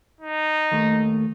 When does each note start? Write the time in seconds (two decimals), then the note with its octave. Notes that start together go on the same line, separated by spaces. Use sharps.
0.21 D#4
0.72 D#2 A3